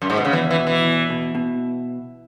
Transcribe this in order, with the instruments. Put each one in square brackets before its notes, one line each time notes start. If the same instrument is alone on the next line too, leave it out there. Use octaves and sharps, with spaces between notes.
[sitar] F#2
G#2
B2
C#3
[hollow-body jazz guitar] E2 [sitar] E3
[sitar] E3
[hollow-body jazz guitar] B2
[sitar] E3
[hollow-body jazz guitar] E2
B2
B2